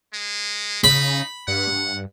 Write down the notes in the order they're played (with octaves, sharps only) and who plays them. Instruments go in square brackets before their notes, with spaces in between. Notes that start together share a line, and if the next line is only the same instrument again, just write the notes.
[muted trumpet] G#3
[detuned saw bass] C#3 [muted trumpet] D#4 [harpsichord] B5
[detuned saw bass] G2 [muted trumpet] F#5